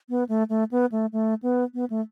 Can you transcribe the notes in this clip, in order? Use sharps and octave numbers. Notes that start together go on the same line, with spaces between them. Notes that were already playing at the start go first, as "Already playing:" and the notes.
B3
A3
A3
B3
A3
A3
B3
B3
A3